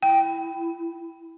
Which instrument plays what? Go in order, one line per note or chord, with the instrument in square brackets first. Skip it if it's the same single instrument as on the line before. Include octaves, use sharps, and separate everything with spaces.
[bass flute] E4 [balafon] G5